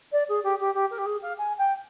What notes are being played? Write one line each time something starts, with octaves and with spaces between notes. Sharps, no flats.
D5
G#4
G4
G4
G4
A#4
G4
G#4
F5
G#5
G5